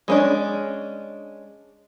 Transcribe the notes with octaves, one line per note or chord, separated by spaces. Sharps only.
G#3 C#4 D4